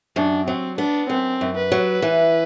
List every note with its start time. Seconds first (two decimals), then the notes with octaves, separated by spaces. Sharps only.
0.16 F#2 D4
0.46 F#3 C4
0.78 B3 D4
1.09 F#2 C4
1.41 F#2
1.57 B4
1.72 F#3
2.02 E3